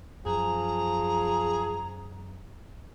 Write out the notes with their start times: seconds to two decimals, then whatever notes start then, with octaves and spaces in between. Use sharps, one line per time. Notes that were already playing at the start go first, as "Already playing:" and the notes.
0.26 F#2 F3 G#4 A#5